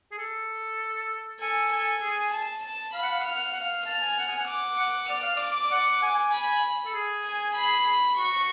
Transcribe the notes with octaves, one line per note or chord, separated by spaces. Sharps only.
G#4
A4
A4 G#5
G#5
G#4
A5
A5
F5 B5
F#5
F5
F#5
F5 F6
F#5
F5
F#5
F5
A5 F6
G#5
F#5
G#5
F#5
D6
F#5
D5 F6
F5
D5 D6
F#5
G#5
G#5
G#5 B5
A4
G#4
G#5
B5
F#4 C#6